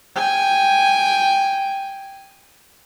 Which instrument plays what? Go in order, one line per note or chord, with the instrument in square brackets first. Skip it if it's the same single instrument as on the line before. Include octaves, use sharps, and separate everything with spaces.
[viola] G5 G#5